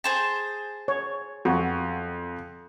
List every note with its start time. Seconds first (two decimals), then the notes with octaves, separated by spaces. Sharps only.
0.04 G#4 C5 A5
0.88 C#5
1.45 F2 F#4